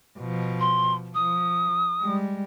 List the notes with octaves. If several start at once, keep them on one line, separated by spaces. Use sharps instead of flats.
B2 F3
C6
F3 D#6
G3 G#3